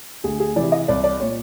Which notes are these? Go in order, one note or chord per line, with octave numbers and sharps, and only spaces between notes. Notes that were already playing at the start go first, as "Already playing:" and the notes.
D2 G#4
G#4
C3 E3 D5
D#5
C2 D5
D5
A#2 C#5